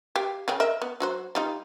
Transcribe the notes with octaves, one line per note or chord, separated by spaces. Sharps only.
G4 F5 G5
C#3 G#4 G5
A#4 D#5 E5
B3
F#3 F#4 C5
G3 D#4 F4